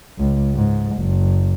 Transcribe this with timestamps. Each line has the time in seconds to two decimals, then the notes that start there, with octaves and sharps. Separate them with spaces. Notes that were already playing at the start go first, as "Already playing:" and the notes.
0.19 C#2
0.55 G#2
0.97 F#1